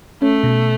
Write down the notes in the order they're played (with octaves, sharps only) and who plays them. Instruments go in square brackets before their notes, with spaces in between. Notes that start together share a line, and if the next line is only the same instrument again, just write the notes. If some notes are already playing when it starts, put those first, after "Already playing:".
[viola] A3 [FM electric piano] C#4
[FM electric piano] B2